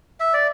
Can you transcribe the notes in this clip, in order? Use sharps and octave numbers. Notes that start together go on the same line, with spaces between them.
E5
D5